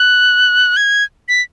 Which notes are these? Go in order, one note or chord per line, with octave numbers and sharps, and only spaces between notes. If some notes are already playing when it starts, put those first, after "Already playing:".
Already playing: F#6
G#6
B6